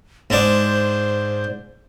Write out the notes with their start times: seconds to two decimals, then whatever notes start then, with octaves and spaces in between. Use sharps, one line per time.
0.30 G#2 D4 C5